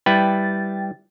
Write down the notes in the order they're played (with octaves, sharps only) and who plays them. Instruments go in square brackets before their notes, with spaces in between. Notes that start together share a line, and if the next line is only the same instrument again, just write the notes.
[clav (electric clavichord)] G3 E4 B4 [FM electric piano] G5 A6